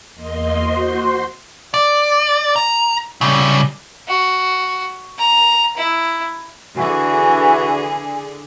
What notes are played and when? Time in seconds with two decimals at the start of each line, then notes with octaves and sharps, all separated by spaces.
0.14 E2 A#3 D#5 C6
0.58 F#4 C5 C6
1.74 D5
2.56 A#5
3.21 C#3 G3
4.08 F#4
5.18 A#5
5.77 E4
6.77 D3 E3 F#4 G#4 G#5